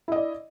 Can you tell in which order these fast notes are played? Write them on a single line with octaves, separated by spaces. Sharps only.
E4 D#5 D5